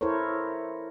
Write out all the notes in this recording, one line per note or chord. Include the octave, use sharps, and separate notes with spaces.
E4 A4 A#4 C5 C#5